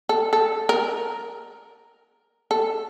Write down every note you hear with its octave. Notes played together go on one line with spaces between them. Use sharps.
A4
A4
A#4
A4